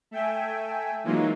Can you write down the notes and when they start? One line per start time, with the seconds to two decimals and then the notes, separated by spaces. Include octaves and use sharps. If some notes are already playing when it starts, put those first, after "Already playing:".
0.11 A3 E5 G5 G#5
1.04 E3 F#3 G#3 A#3 D#4 F4